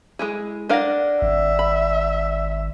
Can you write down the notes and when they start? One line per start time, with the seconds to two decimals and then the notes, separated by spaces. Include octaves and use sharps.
0.19 G#3 E4 G#4
0.70 D4 A#4 D5 F5 F#5 A#6
1.22 G#1 E5
1.59 B5